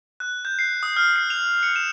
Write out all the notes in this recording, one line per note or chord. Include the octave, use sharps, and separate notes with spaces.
F#6
G6
C7
D#6
F6
C7
F7
C#7
E7